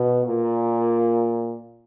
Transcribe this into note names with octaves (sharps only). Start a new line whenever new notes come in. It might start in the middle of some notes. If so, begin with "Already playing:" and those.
Already playing: B2
A#2